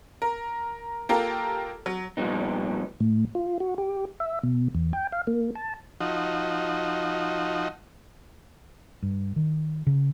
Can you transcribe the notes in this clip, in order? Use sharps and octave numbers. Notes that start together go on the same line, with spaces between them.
A#4
A#3 F4 G4 A4 A#4
F#3
F2 A#2 G3 B3 D#4
A2
F4
F#4
G4
E5
B2
E2
G5
F5
A#3
A5
F3 D#4 F#4
G2
D#3
C#3